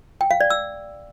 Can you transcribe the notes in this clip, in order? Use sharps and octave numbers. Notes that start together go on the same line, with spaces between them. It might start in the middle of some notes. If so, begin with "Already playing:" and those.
G5
F5
D5
E6